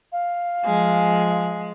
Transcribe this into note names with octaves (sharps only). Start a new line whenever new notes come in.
F5
F3 G#3